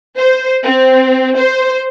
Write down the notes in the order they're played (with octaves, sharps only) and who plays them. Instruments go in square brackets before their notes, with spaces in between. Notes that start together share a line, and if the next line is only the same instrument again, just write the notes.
[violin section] C5
C4
C5